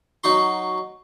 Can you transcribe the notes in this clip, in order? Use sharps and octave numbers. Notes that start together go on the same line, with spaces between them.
F#3 D#4 F#4 C6